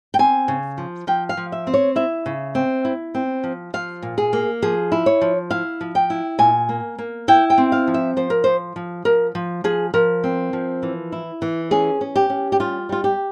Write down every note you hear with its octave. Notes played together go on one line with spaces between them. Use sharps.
G5
C4 G#5
C#3
F3
F3 G5
F5
F3
E5
C4
C#5
E4 E5
C#3
C4
E4
C4
F3
F3 F5
A#2
G#4
A#3
F3 G#4
E4
C#5
F3
E4 F5
F3
G5
E4
A#2 G#5
A#3
A#3
E4 G5
G5
C4
F5
F3
E5
F3 C5
A#4
F3 C5
F3
F3 A#4
F3
F3 G#4
F3 A#4
C4
F3
E3
E4
E3
C#4 G#4
C#4
G4
C#4
G4
G3 F4
G3 F4
G4